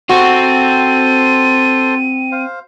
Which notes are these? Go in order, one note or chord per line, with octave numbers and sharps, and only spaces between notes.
C4 F#4 A4 C5 C6 D#7
C5 F5